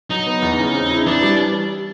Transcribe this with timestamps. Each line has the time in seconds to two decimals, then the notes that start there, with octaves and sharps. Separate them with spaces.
0.10 F#3 D#4
0.26 B3
0.42 E2
0.59 C#3
0.75 C4
0.91 E4
1.06 E3 D4
1.23 G3